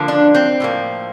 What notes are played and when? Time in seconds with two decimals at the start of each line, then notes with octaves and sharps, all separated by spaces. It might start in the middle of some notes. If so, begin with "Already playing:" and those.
Already playing: D3 F3 A#3
0.08 D4
0.35 C4
0.60 A2 F3 A#3